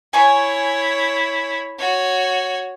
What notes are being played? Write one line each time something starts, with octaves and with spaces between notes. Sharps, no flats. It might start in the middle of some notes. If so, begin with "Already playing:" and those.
E4 C#5 G#5 C#6
F#4 C#5